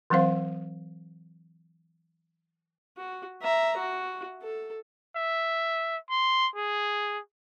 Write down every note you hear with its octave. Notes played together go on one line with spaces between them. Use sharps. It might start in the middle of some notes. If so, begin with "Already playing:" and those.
E3 F#3 C4 C5 F5
F#4
E5 A#5
F#4
A4
E5
C6
G#4